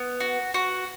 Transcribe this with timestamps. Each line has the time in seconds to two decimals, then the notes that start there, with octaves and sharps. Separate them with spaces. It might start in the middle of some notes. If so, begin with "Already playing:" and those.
Already playing: B3
0.20 F#4
0.54 F#4